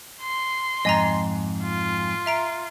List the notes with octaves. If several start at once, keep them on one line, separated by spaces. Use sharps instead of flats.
C6
F2 G#2 D#5 G#5 A#5
F4
E5 A#5 D7